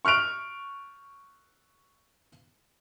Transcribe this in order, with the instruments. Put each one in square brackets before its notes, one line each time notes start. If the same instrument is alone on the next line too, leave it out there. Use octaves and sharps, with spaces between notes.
[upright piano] C#6 F6 F#6 D7 F7